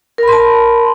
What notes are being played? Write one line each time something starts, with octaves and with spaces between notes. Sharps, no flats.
A#4 A5 B5 C6